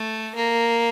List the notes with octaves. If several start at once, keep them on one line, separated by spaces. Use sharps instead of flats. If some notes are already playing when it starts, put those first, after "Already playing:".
Already playing: A3
A#3